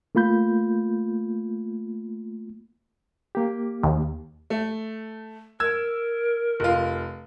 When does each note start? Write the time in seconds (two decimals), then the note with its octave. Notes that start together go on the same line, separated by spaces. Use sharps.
0.15 A3 A#3 F4 B5 G6
3.35 A#3 G4
3.83 D#2
4.50 A3
5.60 A#4 E6 G#6
6.60 F1 F4